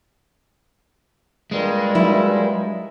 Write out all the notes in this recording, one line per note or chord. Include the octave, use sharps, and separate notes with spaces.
G2 A#2 G3 G#3
F#3 E4